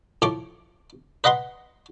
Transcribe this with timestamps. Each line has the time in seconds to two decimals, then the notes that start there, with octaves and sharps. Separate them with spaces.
0.22 A2 F3 C#6 D6
1.24 B4 D#5 F#5 B5 C6